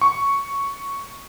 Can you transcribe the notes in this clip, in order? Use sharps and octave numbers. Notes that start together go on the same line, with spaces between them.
C#6